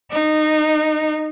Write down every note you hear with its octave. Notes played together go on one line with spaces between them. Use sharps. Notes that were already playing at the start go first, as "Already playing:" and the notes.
D#4